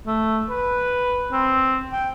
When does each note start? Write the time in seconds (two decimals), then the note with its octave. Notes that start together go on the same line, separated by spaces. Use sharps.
0.07 A3
0.50 B4
1.32 C4
1.92 G5